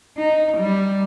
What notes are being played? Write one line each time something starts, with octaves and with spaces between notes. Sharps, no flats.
D#4
G3